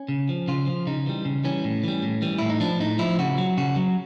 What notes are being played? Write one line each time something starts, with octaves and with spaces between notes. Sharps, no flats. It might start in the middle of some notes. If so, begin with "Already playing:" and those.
Already playing: C#4
C#3
F3
C#3 F4
F3
C#3 D#4
E3 G3
C#3
E3 G3 C#4
A2
E3 G3
A2
E3 G3
A2 E4
D#4
F3 D4
A2 D#4
F3 E4
C#3 F#4
F#3
C#3 F#4
F#3